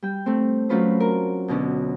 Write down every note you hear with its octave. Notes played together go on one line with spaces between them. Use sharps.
G3 G5
A3 C4
F#3 A3 C#4 F4 B4 C5
A#4
D2 B2 D3 C#4 D5